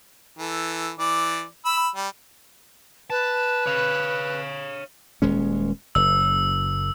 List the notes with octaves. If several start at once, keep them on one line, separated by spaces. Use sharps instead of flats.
E3 A4
E3 D5
B5 E6
G3
B4 A5
C#5 F5
D#1 G#3 C#4
F#1 E6